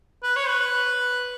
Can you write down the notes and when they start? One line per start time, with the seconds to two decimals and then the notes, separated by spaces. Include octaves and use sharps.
0.23 B4
0.36 C#5
0.48 B4